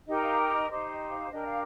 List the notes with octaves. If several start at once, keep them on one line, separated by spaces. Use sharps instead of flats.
D#4 G4 A#4 D#5
F5
G5
D#5
D#4 G4 C5 D#5
D#5
F5
D4 G4 A#4 D#5
F5